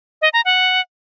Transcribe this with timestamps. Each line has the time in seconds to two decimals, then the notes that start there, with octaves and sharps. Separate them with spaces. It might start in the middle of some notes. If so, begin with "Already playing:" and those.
0.22 D#5
0.33 A#5
0.45 F#5